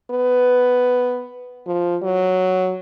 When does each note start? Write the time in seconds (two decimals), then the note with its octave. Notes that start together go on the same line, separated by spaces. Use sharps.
0.11 B3
1.67 F3
2.03 F#3